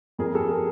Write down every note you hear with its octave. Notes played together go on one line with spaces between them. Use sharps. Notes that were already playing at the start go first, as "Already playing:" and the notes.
F2 G#4 A#4
G4 A4
G#4 A#4